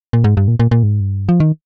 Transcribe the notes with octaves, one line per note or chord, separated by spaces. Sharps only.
A#2
G#2
G2
A#2
A#2
A#2
G#2
G2
F3
D#3